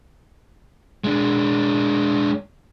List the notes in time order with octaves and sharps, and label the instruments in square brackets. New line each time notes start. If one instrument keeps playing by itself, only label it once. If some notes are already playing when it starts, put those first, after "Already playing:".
[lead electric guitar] G#3 D4